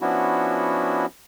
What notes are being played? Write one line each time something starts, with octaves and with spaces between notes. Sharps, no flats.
F3 B3 C#4 D4 E4 F#4